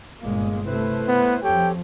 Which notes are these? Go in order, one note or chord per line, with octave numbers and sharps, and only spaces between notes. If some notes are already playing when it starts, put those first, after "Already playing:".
G1 A#2 G#3 A#3
C3 A3 E4 B4 C5
B3
F2 F3 G4 A4 C#5 G5